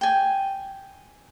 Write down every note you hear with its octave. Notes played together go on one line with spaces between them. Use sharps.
G5 G#5